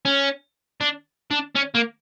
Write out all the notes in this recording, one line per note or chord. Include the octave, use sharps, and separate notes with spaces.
C#4
D4
D4
C#4
A#3